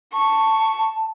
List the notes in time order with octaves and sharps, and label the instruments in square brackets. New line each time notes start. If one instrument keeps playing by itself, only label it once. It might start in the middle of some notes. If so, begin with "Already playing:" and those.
[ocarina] A5 [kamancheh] C#6